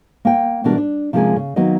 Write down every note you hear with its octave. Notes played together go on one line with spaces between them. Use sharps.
A#3 G5
B2 E3 G3 D4 A#4
D4
C3 F3 G#3 A#3 C#4 G#4
C#3
D#3 F#3 A#3 B3 D#5